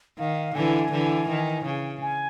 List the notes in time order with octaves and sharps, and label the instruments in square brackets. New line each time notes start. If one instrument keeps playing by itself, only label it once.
[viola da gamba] D#3 [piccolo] F5
[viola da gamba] D3 E3 [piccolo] G#5
[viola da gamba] D3 E3
D#3
C#3
[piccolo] G#5